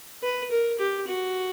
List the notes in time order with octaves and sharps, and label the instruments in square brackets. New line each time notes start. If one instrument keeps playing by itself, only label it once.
[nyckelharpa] B4
A#4
G4
F#4